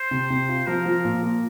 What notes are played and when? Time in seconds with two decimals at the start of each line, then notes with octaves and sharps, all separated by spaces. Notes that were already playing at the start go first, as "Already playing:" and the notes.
Already playing: C5
0.11 C3
0.30 C3
0.49 F4
0.67 F3 A#4
0.85 F3
1.05 A#2
1.22 A#3